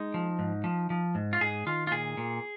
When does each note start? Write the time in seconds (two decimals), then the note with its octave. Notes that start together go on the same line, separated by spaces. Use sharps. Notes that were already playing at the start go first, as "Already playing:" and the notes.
Already playing: G#3 D#4
0.14 F3
0.39 G#2
0.64 F3
0.90 F3
1.15 G#2
1.33 F4
1.41 G#2 G#4
1.66 D#3 F4
1.87 F4
1.91 A#2 G#4
2.17 A#2